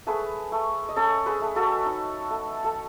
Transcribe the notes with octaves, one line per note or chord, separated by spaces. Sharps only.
A3 G#4 B4
A3
D#5
C#4 A4 C#5
G#4 B4
A3
F#4 A4
D#4
A3
A4